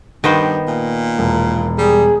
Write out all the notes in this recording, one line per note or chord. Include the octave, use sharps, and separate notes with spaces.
G2 D#3 B3 C5
A#2
E1
G3 G#4